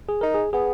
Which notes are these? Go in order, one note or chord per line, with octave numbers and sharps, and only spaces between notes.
G#4
D#4 A#4
G#4
B3 G#4